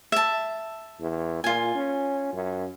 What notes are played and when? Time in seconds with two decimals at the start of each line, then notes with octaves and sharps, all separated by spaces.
0.12 E5 A5
1.00 E2
1.44 A#2 F4 G#5
1.75 C#4
2.33 F#2